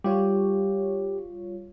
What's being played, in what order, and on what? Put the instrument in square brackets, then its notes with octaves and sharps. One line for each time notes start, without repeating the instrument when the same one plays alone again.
[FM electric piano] G3 F4 C#5 [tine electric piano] G4